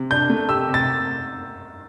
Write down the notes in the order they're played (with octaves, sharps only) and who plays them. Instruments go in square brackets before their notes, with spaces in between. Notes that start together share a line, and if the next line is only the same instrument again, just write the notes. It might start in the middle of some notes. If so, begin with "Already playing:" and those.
Already playing: [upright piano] C3
[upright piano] D4 [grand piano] G6
[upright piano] A3
[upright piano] G4 [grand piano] E6
[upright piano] C3
[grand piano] A6